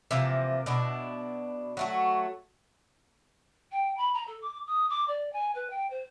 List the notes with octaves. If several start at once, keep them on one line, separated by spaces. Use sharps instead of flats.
C3 E3 F3 A#3
B2 D4 E4
F#3 A3 F#4
G5
B5
A#5
A4
D6
D#6
D6
D5
G#5
B4
G5
C5